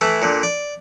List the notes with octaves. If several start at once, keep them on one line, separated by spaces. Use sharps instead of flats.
E3 A3 E4
A#2 D3
D5